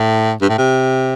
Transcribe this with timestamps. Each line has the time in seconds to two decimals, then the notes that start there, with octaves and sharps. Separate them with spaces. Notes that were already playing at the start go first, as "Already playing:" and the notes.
Already playing: A2
0.42 G2
0.49 A2
0.58 C3